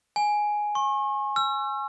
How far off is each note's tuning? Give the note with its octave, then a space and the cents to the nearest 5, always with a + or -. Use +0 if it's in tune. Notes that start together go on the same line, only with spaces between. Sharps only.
G#5 +5
C#6 -40
E6 +40